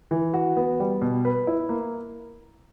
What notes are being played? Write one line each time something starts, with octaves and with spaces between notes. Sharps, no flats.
E3
F#4
B3
G3
B2
B4
E4
A#3